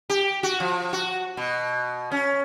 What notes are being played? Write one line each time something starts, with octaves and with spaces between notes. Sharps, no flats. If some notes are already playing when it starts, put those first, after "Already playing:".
G4
F#4
F3
F#4
B2
C#4